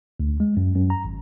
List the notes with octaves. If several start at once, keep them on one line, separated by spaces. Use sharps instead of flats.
D2
G#3
F#2
F#2
A#5
G#1